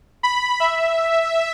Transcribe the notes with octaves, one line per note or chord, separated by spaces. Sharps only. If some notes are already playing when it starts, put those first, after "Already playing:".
B5
E5